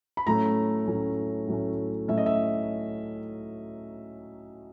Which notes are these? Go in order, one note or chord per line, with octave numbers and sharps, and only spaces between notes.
B5
A2 F#3 A3 C#4 A#5
A2 F#3 A3 C#4
A2 F#3 A3 C#4
A2 F#3 A3 C#4 E5
D#5
E5